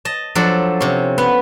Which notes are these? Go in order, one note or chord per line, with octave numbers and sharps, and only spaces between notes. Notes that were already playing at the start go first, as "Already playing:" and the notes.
D#5 A5
F3 F#3 D4 A4
C3 C#4
B3